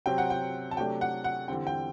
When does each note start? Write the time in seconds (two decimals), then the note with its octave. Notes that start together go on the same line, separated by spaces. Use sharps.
0.06 C3 F#3 C4 G5
0.18 F#5
0.30 G5
0.71 A5
0.77 C3 F#3 A3 D4 G5
1.01 F#5
1.24 F#5
1.48 E2 D3 G3 C4 G5
1.67 G5